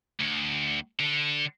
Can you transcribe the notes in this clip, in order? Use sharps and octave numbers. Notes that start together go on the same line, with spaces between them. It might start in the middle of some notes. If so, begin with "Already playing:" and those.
D2
D3